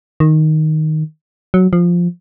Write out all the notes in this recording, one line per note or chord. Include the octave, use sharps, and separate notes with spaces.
D#3
F#3
F3